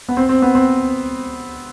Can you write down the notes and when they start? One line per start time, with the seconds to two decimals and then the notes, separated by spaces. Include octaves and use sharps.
0.09 B3
0.17 C4
0.29 C4
0.42 B3
0.55 C4